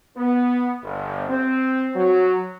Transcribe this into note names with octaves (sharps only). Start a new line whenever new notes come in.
B3
G1
C4
F#3